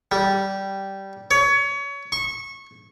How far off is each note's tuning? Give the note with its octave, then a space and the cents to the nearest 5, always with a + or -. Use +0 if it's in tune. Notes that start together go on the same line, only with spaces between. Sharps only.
G3 -10
C#5 +25
C#6 -20